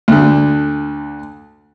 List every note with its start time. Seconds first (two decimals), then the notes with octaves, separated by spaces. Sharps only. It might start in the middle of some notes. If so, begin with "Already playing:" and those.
0.08 D2 D3